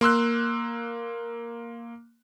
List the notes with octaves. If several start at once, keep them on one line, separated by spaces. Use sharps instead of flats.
A#3 C6 E6 F#6